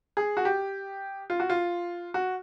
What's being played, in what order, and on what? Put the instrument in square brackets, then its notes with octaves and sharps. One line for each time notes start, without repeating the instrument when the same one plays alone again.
[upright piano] G#4
F#4
G4
F4
F#4
F4
F#4